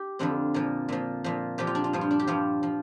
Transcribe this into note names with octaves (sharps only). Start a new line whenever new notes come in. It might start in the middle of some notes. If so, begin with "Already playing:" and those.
Already playing: G4
F2 D3 F3 C4
A#2 F3
A#2 F3
A#2 F3
A#2 F3 G4
F4
D4
F4
G2 F3
F4
D4
G4
G2 F3 F4
F3